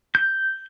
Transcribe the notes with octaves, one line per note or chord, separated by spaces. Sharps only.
G6